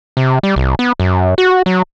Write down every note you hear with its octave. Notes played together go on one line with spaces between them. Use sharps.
C3
G3
C2
B3
F#2
F#4
F#3